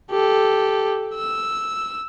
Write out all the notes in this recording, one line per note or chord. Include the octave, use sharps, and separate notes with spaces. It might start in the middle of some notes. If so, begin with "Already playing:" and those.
G4 A4
E6